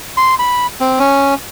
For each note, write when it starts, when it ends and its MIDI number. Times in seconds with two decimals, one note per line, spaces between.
0.17 0.35 84
0.39 0.67 83
0.80 0.99 60
0.99 1.34 61